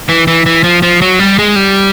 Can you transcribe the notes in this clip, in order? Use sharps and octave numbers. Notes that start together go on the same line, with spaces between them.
E3
E3
E3
F3
F3
F#3
G3
G#3
G3